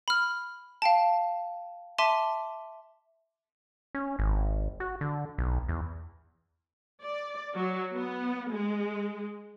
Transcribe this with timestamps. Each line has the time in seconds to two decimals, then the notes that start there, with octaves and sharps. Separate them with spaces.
0.08 B5 F6
0.82 F5 G5 A5
1.98 E5 A5 C6 D6 B6 D#7
3.95 C#4
4.19 G#1
4.80 F#4
5.01 D3
5.38 B1
5.68 E2
7.03 D5
7.56 F#3
7.94 B3
8.52 G#3